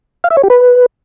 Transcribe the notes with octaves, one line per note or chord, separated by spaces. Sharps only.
F5
E5
C#5
G4
B4